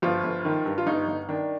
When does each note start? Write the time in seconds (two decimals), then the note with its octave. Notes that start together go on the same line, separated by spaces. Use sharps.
0.02 G1 F3 F4
0.23 G1
0.45 D#3
0.66 G2
0.78 F4
0.86 G1 D#4
1.08 G1
1.28 D#3 D4